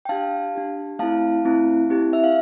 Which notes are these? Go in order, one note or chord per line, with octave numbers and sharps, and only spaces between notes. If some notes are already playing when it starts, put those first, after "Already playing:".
G5
D4 G4 F5 A5
D4 G4
A3 C4 E4 F5 A5
A3 C4 E4
C4 E4 G4
E5
F5